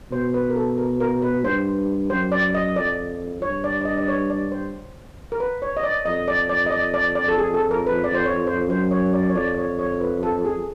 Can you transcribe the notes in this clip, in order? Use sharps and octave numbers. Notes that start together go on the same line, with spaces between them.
B2 C5
B4
A#4
A4
A#4
A#4
B4
G2 C5
F#2 C5
D5
D#5
F2 D5
G2 C#5
D5
D5
D#5
D5
C#5
D5
C5
A#4
B4
C#5
D#5
D5
F2 D#5
D5
D5
D#5
D5
D5
D5
A4
G#4
A4
A#4
B4
D5
C5
C#5
C5
F#2 C5
C#5
D5
C#5
F2 D5
C#5
C#5
B4
A4
G#4